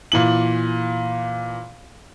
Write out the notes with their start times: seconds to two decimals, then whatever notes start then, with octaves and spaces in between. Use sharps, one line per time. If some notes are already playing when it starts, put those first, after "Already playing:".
0.12 A#2 E3 F#7